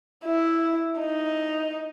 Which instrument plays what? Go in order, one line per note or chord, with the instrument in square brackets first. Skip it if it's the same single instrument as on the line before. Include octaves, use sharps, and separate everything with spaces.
[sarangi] E4
D#4